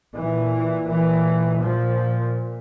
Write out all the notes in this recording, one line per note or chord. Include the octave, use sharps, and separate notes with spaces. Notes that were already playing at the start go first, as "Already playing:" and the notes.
A#2 E3
E3
F3